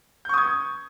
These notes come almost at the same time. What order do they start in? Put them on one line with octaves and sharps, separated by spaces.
G6 C#6 D#6 G#6